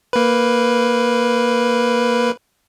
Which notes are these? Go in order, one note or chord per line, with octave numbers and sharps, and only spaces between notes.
A#3 B4